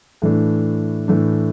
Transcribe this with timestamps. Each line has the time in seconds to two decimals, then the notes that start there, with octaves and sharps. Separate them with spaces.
0.22 A2 E3 A3 D4
1.08 A2 E3 A3 D4